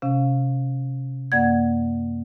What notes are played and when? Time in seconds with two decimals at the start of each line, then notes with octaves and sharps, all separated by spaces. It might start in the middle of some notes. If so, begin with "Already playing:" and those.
0.02 C3 C#4 F5
1.32 F#2 A#3 D5 F#5 G#6